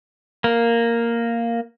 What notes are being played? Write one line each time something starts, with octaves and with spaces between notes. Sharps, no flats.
A#3